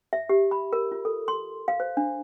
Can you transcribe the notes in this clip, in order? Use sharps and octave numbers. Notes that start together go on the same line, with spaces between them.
E5
G4
B5
A#4
F4
A4
C6
F5
C5
D4